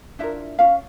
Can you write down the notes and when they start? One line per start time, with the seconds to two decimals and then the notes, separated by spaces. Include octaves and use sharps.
0.19 D4 E4 F4 A#4 E5
0.59 C#4 F4 F5